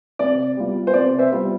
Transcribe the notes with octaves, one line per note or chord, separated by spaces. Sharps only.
C3 D5
G3 B3 F4
C5
C3 D5
C5 E5
G3 B3 F4